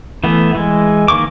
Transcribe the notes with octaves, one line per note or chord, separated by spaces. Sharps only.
E3 A3 B3
E3 G#3
D#3 A#3 C#6 D6